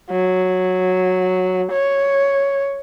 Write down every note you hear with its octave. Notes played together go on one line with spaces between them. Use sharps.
F#3
C#5